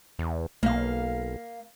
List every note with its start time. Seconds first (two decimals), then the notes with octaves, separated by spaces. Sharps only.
0.19 E2
0.63 B1 A#3 F5